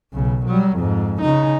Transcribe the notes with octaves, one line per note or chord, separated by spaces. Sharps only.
B1 C#3
F#3 G3
F2 G#2
C#3 D#4